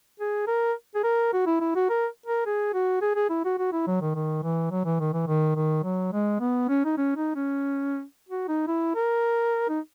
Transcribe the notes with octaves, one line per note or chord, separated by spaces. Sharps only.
G#4
A#4
G#4
A#4
F#4
E4
E4
F#4
A#4
A#4
G#4
F#4
G#4
G#4
E4
F#4
F#4
E4
F#3
D#3
D#3
E3
F#3
E3
D#3
E3
D#3
D#3
F#3
G#3
B3
C#4
D#4
C#4
D#4
C#4
F#4
D#4
E4
A#4
D#4